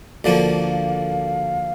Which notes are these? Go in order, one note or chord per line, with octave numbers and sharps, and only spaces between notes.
D2 D3 F3 A#3 F5